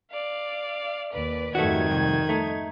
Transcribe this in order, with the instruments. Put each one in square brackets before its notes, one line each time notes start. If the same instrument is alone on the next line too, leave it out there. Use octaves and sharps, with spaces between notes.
[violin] D5 F5
[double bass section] D#2 [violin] B4 D5
[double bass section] F2 G#2 G3 [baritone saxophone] D#3 [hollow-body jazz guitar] A3 F#4 [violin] G#6
[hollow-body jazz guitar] C2
A3 D#4